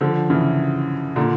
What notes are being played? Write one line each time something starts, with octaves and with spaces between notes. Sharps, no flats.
D3 F3
C#3 E3
A#2 D3